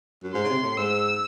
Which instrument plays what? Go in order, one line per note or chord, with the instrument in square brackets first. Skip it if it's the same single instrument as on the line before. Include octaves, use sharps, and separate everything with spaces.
[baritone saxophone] F#2
[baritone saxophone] G#2 [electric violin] C6
[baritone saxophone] C#3
C3
A2
[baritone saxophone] G#2 [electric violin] E6